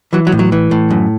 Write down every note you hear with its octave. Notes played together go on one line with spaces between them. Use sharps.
E3 F#3
F#3
A2
F#3
E3
A2
F#2